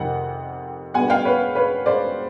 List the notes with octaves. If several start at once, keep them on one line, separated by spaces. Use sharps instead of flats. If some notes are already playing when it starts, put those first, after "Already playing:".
Already playing: F2 C3 D#3 F#5
B2 G3 B3 D4 F#5 G#5
F5 G5
B4 C#5
B4 C#5
C5 D5